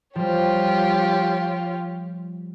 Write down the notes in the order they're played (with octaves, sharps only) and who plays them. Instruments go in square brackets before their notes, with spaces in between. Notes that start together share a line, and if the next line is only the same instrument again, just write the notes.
[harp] F3 G3 [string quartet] F4 G4 C#5